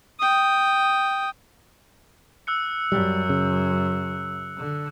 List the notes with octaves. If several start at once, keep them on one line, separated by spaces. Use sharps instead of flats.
G5 D#6
E6 F#6 C#7
F#2 G3
C#3
D3